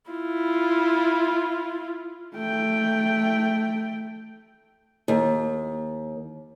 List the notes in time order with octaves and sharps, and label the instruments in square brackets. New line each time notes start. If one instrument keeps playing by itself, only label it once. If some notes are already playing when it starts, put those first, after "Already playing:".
[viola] E4 F4
[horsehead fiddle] A3 G5
[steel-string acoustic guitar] D#2